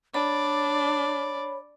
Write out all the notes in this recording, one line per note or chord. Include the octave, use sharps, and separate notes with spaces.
D4 C#5 D5 B5